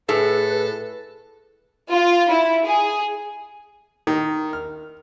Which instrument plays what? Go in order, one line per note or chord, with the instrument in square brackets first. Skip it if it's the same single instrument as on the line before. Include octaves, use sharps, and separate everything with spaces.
[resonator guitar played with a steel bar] A2 [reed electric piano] G#4 [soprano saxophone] A4 [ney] B4
[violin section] F4
E4
G#4
[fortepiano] D#3
F6